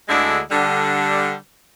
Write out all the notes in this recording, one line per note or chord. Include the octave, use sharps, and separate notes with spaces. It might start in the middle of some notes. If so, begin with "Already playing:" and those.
D2 D3 G#3 E4 G#4 D5
D3 G3 D4